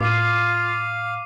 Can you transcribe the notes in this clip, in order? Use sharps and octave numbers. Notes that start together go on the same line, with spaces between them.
A2 F4 F5 D6 C7 D#7